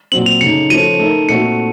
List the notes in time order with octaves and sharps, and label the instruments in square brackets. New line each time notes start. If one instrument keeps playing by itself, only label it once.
[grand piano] A#2 F#3 C4 [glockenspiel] F#7
[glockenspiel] F7
[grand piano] C#3 A3 D#4 [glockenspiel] C#7
[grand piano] F3 A3 C#4 A4 C5 [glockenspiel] D#7
[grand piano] A3 D#4 A#4
[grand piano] A#2 A3 C4 F#4 A4 [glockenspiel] C#7